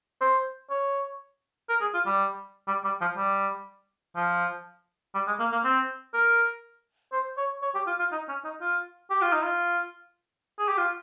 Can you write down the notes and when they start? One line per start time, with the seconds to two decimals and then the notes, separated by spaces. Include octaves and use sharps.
0.21 C5
0.70 C#5
1.69 A#4
1.81 G#4
1.94 F4
2.06 G3
2.68 G3
2.85 G3
3.01 F3
3.17 G3
4.16 F3
5.15 G3
5.27 G#3
5.40 A#3
5.52 A#3
5.65 C4
6.14 A#4
7.13 C5
7.37 C#5
7.62 C#5
7.75 G4
7.87 F4
7.99 F4
8.12 D#4
8.29 C#4
8.44 D#4
8.61 F4
9.10 G4
9.22 F4
9.33 D#4
9.43 F4
10.59 G#4
10.69 G4
10.78 F4